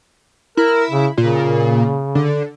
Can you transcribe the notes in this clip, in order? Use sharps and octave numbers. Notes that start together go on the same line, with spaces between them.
E4 A#4
C#3
A#2 C#3
D3